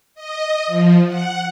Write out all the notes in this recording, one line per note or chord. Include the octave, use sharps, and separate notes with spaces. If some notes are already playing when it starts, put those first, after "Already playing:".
D#5
F3
F#5